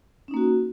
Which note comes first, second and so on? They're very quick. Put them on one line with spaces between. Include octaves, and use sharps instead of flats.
C#4 D#4 A#3 F#4